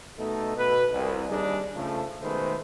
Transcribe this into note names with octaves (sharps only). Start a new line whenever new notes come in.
B2 A3 D#4 A4
B2 B4
C2
D#2 G3 D4 D#4 G#4
C#3 F3 A3
B2 D#3 G#3 A3 B4 C5